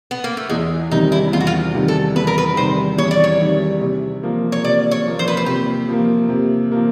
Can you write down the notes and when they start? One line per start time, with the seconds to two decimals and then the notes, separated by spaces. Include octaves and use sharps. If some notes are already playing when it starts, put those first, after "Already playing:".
0.11 B3
0.24 A#3
0.37 A3
0.49 E2 G#3
0.91 C3 D#3 G3 D#4
1.12 E4
1.32 E2 F4
1.40 F#4
1.47 F4
1.74 C3 D#3 G3
1.88 A4
2.15 E2 B4
2.27 A#4
2.38 B4
2.57 C3 D#3 G3 C5
2.98 E2 C#5
3.11 D5
3.24 C#5
3.40 C3 D#3 G3
3.81 C3
4.23 F3 A#3
4.52 C#5
4.64 C3 D5
4.91 C#5
5.06 F3 A#3
5.19 C5
5.28 B4
5.37 C5
5.46 C3 G4
5.89 F3 A#3
6.29 C3
6.71 F3 A#3